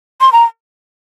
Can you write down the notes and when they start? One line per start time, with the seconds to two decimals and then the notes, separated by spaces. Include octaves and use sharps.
0.21 C6
0.33 A#5